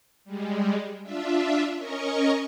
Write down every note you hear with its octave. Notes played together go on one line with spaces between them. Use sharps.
G3 G#3
D4 F4 E5
C#4 A#4 D#5 C#6